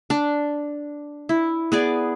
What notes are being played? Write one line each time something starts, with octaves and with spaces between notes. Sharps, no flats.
D4
E4
B3 G#4 D5